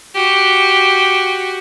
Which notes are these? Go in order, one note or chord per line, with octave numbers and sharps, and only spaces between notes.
F#4 G4